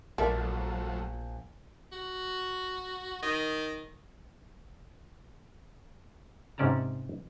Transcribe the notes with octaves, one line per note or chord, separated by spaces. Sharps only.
A#1 F3 F#3 A3 A4 A#4 D5 E5
F#4
D#3
G#2 C3 C#4 D5 A5 A#5